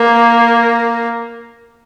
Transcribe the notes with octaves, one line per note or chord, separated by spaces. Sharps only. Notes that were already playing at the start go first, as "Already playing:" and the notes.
Already playing: A#3